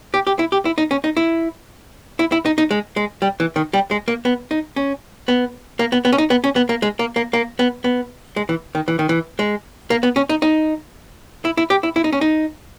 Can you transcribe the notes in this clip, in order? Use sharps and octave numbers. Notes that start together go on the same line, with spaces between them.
G4
G4
E4
G4
E4
D#4
C#4
D#4
E4
E4
E4
D#4
D#4
G#3
G#3
G3
E3
D#3
G3
G#3
A#3
B3
D#4
C#4
B3
A#3
B3
B3
C#4
D#4
B3
C#4
B3
A#3
G#3
A#3
A#3
A#3
B3
B3
G#3
E3
D#3
E3
D#3
E3
G#3
A#3
B3
C#4
D#4
D#4
E4
E4
G4
E4
E4
D#4
C#4
D#4